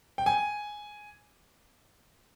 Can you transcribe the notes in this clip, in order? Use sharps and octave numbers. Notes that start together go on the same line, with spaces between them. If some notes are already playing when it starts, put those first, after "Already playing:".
G5
G#5